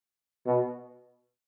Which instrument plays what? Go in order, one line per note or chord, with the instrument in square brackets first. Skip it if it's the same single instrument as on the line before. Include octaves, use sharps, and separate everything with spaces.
[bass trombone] B2